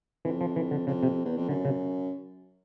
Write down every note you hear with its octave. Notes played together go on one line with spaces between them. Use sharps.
F2 E3
F3
E3
D3
F2 C#3
C3
E2
F2
F#2 D3
C#3